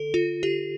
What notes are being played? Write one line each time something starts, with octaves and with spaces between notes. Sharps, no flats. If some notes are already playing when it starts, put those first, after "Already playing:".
Already playing: D3 A4
F4
G4